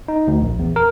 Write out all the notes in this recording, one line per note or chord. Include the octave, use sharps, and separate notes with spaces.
D#4
D2
A#1
E2
A#4